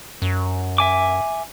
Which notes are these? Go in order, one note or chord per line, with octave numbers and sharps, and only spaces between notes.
F#2
E5 G#5 D6